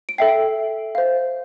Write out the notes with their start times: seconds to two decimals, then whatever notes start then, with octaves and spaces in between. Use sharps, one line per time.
0.09 D7
0.18 A4 E5 G5 C7
0.95 C5 F5